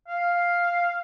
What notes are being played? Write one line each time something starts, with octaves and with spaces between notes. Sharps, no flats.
F5